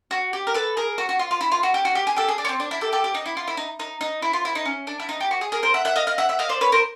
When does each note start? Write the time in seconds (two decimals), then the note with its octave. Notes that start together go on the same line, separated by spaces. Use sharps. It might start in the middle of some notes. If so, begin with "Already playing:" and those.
0.11 F#4
0.33 G4
0.47 A#4
0.54 A4 B4
0.77 G#4 A#4
0.98 F#4
1.09 F#4
1.19 F4
1.31 F4
1.41 E4
1.52 F4
1.63 F#4
1.74 G4
1.85 F#4
1.95 G4
2.07 G#4
2.16 G4 A4
2.28 G#4
2.38 D4
2.45 C#4
2.49 C4
2.60 D4
2.71 E4
2.81 G4 A4
2.93 G4 A4
3.04 G4
3.15 D#4
3.26 E4
3.37 F4
3.48 E4
3.57 D#4
3.79 D#4
4.01 D#4
4.22 E4
4.33 F4
4.45 E4
4.55 D#4
4.65 C#4
4.87 D4
5.00 E4
5.09 D#4
5.21 G4
5.31 F#4
5.41 G#4
5.52 G#4 A#4
5.63 A#4 C5
5.74 E5 F#5
5.85 E5 F#5
5.96 D#5 F5
6.07 D#5 F5
6.18 E5 F#5
6.29 E5 F#5
6.39 D#5 F5
6.49 C5 D5
6.61 B4 C#5
6.72 A#4 C5